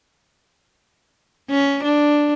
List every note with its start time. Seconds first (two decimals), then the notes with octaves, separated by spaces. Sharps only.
1.50 C#4
1.83 D4